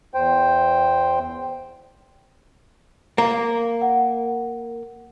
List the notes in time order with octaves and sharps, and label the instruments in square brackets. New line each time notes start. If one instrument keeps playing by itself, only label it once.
[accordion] E2 C5 G5
[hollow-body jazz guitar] A#3
[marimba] F#5